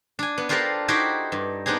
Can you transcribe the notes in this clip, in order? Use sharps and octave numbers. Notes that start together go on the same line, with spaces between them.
D4 G#5
B3
D4 F4 G4 A4 A#4 C5
D#4 E4 F#4 G4 C5 D5
G2
B3 C4 D4 D#4 G#4